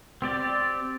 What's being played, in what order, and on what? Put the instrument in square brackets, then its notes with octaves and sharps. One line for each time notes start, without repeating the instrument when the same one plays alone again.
[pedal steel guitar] C4 G4 D5